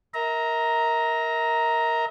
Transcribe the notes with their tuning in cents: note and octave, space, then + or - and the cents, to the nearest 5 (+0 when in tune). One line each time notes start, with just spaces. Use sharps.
A#4 +0 E5 -45 A#5 +0